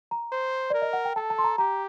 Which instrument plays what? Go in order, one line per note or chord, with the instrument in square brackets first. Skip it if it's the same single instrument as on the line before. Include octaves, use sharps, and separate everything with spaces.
[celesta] A#5
[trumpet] C5
[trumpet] A#4 [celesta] D5
[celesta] D#5
F#5
G5
[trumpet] A4 [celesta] A5
[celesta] A5
C6
A#5
[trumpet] G4 [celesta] A#5